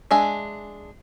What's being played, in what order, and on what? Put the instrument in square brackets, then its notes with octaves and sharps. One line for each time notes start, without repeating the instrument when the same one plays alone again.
[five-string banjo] G#3 D4 E5 G#5